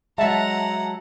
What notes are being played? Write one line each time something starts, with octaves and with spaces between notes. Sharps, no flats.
F#3 G#3 E5 F#5 A5 A#5